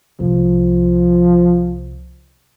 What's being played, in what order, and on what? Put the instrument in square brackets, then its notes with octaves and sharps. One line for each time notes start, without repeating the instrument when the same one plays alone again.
[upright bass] C2 [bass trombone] F3